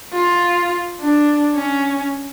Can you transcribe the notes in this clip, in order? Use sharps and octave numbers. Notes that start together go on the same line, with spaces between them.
F4
D4
C#4